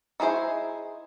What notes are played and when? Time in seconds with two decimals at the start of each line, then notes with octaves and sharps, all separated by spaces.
0.20 D#4 E4 G#4 C5